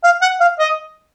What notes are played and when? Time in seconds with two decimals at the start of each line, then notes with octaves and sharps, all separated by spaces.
0.04 F5
0.22 F#5
0.40 F5
0.59 D#5